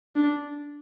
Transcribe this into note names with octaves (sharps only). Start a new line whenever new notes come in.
D4